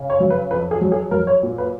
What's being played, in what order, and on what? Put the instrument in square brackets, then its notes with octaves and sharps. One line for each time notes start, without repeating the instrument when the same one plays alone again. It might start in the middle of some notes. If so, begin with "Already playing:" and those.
Already playing: [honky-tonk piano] C#3
C#5
F#3
B4
F2 B4
G#4
F#3
G#4
F#3 A#4
C#5
A#2
B4